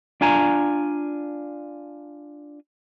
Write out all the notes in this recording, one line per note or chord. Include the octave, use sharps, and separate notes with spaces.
D4 F4 G#5 A#5